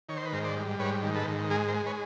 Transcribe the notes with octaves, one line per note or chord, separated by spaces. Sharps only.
D#3 C#5
C5
B4
G#2 A#4 C5
C5 D5
G3
G#2 B4 C#5
D#3
A4 B4
G#2
G#3 G#4 A#4
A#4 C5
G#3
B4 C#5